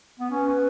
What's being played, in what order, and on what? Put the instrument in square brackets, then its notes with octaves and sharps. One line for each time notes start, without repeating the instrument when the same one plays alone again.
[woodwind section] B3
[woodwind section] C#4 [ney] B4
[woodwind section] C#4